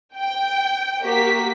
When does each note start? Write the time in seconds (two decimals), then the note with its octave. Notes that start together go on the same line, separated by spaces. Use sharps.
0.16 G5
1.02 A#3 F#4 G4 B6